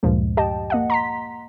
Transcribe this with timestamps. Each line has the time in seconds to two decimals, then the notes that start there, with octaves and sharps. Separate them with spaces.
0.03 D2 G2 A#2 F3 G#3
0.37 G4 D#5 G5 A5
0.70 A#3 D#5 F#5
0.90 A#5 C6 B6